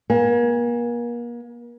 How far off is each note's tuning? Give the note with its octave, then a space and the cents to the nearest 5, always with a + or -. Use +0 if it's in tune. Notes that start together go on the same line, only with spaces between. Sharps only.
A#3 +40 G#5 -30